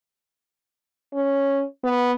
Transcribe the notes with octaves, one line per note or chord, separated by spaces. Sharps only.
C#4
B3